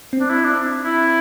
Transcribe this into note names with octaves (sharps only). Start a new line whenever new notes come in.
C4
D4
E4
D4
E4